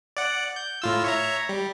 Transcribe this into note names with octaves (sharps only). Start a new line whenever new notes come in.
D5 F#5
G6
A2 F4 E6
C#5 E5 A#5
G3